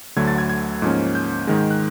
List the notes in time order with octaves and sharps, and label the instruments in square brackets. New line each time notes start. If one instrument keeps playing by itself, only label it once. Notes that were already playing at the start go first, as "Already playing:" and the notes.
[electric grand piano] D2 D3 F#3 A3 G#6
A6
G#6
G#6
G#2 F3 A#3 C#4
G6
G#2 D#3 G#3
F#6